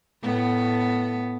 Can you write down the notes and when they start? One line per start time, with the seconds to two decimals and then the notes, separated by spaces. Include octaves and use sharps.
0.23 A2 B3